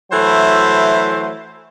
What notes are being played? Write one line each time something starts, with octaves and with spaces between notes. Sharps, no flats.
E3 F#3 A3 E4 C5